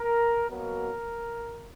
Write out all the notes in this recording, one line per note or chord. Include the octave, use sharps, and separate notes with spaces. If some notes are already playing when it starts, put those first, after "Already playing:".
Already playing: A#4
B2 F#3 A#3 A#4